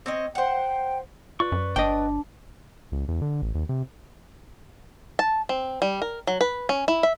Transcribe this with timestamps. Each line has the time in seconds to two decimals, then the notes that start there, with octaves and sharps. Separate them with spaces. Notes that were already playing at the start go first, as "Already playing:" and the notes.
0.06 C4 C#5 D#5
0.35 C5 F#5 G5
1.40 F4 B4 D5 C#6
1.52 F#2
1.76 G1 D4 D#5 G5
2.92 C#2
3.08 E2
3.22 D3
3.42 A1
3.55 D#2
3.69 C3
5.19 A5
5.49 C4
5.82 G3
6.02 A#4
6.27 F#3
6.41 B4
6.69 C#4
6.88 E4
7.03 E5